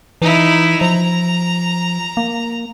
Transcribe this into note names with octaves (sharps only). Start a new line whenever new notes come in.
E3 D#4 E4
F3 A#5
A#3